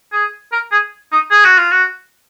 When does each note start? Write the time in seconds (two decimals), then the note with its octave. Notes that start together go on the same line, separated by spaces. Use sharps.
0.13 G#4
0.52 A#4
0.72 G#4
1.12 D#4
1.31 G#4
1.45 F#4
1.58 F4
1.72 F#4